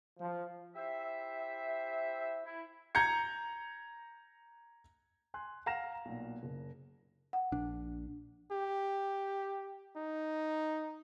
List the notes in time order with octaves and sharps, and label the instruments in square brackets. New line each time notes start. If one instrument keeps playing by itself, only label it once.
[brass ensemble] F3
[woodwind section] E4 G4 C5 E5
E4
[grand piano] A#5 G6 G#6 C#7
[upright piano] G#5 C6 F#6
F5 F#5 A#5 A#6 E7
B1 A#2
F#1
[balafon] F#5
[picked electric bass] A#1 D4
[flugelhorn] G4
D#4